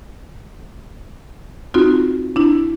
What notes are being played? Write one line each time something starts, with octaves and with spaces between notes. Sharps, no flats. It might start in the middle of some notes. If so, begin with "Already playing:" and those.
C4 D#4 F4 F#4
D4 E4